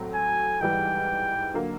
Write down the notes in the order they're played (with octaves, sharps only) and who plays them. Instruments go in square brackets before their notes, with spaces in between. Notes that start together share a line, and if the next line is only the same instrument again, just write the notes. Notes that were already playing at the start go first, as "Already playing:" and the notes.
Already playing: [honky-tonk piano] A2 F#3 A3 C4
[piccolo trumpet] G#5
[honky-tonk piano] G#2 E3 G3 [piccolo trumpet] G5
[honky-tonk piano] D3 F#3 A#3